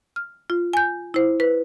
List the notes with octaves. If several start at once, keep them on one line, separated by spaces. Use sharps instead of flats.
F6
F4
G#5 G6
E4 C5
B4